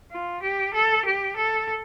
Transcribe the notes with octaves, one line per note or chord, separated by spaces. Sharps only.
F4
G4
A4
G4
A4